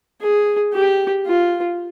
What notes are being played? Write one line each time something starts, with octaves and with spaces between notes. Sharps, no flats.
G#4
G4
F4